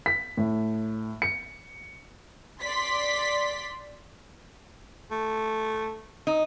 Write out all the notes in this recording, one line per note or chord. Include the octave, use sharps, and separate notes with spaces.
B6
A2
C#7
D5 C6 B6
A3
D#4